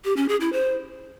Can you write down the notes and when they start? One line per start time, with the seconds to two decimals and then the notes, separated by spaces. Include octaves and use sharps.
0.05 G4
0.17 C#4
0.29 G#4
0.41 E4
0.53 C5